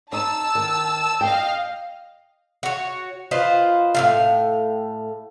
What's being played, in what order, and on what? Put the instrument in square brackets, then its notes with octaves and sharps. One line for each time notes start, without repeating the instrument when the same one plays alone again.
[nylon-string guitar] D#4 [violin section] A5 E6
[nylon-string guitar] D#3
[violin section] D#5 F5 [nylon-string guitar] G5
[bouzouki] F#4 C#5
F4 B4 C5 D#5
A2 C3 F5